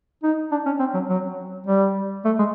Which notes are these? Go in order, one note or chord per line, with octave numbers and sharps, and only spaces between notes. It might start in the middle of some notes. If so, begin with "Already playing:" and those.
D#4
D4
C#4
C4
F#3
F#3
G3
A3
G#3